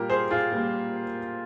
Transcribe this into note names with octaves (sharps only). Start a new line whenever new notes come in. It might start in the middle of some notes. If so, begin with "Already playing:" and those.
Already playing: A#2 G3 A#3 G4 A#4
G#4 C5
F4 G#4
A#2 G3 A#3